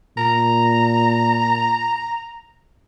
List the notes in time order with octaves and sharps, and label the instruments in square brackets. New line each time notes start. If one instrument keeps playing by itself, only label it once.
[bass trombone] A#2 [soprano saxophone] A#5